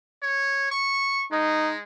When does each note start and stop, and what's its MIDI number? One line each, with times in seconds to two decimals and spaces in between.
0.22 0.70 73
0.72 1.25 85
1.32 1.83 56
1.32 1.72 63